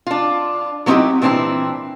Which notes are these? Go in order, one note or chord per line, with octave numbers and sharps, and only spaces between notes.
D4 F4
F#3 B3 C4 D#4 E4 G4
A#2 E3 C4 D4 E4